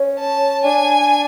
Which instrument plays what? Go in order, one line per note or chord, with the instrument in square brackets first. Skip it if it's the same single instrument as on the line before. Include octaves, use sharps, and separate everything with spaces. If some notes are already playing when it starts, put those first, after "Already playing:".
Already playing: [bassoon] C#4
[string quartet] A5
[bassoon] D4 [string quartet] G#5